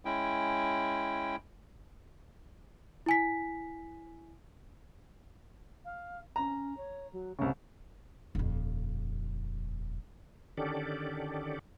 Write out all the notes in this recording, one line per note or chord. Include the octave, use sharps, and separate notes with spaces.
G#3 C#4 E4 G5
E4 G#5 B6
F5
C#4 A#5
C#5
F#3
C2 C#3 B3
D#1 F2
D3 D#3 C#4 G4 A4 D5